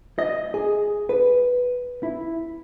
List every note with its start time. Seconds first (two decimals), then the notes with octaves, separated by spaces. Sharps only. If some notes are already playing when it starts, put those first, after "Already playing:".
0.19 D#5
0.54 G#4
1.09 B4
2.03 E4